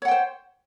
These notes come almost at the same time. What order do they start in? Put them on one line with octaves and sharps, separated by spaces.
C#5 F#5 G5 C5